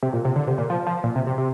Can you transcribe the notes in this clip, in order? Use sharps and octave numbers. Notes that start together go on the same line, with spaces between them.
C3
A#2
C3
D3
C3
A#2
F3
F3
A#2
C3
C3
C3